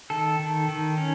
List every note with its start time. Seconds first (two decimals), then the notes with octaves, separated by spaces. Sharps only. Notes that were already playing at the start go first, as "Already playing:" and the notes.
0.10 D#3 A4
0.40 D#3
0.69 D#3
0.98 C#4